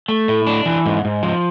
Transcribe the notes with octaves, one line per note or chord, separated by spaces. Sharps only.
A3
A2
D4
E3
G#2
G#2
F3